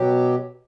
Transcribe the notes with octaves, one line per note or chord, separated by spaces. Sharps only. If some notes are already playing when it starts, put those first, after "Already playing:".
Already playing: B2 F#3 G4